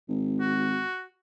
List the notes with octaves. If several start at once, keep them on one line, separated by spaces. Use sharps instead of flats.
G#1
F#4